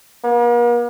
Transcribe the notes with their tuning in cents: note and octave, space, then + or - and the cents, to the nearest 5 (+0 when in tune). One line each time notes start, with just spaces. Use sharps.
A#3 +45